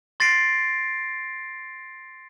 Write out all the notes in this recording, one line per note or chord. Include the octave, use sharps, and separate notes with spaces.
C6 A6 A#6 C7 D7